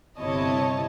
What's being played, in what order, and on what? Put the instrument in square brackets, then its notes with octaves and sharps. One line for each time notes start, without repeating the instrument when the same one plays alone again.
[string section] G1 C3 E4 C#5 D#5 A5